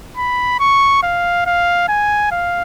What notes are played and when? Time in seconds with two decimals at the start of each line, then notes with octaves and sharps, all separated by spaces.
0.17 B5
0.60 C#6
1.03 F5
1.46 F5
1.89 G#5
2.31 F5